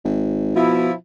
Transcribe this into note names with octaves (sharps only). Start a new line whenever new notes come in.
G#1
B2 F3 E4